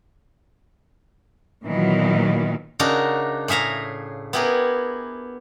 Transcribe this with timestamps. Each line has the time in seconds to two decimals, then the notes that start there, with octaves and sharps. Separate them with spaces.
1.64 A#2 D#3 E3 F#3 B3
2.79 C#3 D4 D#4 F#4 A#4
3.48 A2 G#4 E5 F5 A#5
4.33 B3 E4 G4 G#4 A#4